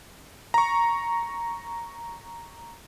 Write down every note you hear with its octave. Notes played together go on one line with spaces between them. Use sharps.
A#5 C#6